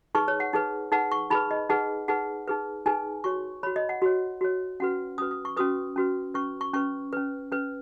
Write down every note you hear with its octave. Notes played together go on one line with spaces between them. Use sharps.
D#4 G#4 B4 C#6
C#5
F#5
D#4 G#4 B4
D#4 G#4 B4 F#5
C#6
D#4 G#4 B4 B5
D#5
D#4 G#4 B4 F#5
D#4 G#4 B4 F#5
D#4 G#4 B4
D#4 G#4 B4 G#5
F#4 C#5 C#6
F#4 C#5 B5
D#5
F#5
F#4 C#5
F#4 C#5
C#4 F#4 B4 F#5
C#4 F#4 B4 D#6
D#6
C#6
C#4 F#4 B4 D#6
C#4 F#4 B4
C#4 B4 C#6
C#6
C#4 B4 C#6
C#4 B4
C#4 B4